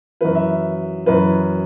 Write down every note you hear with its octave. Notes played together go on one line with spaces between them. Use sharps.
F#2 E3 B4
E5
F#2 E3 B4